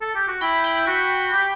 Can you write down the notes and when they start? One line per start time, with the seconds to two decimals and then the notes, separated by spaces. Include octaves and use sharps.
0.01 A4
0.15 G4
0.28 F#4
0.41 E4 G5 B5
0.64 G5 B5
0.87 F#4
1.33 G4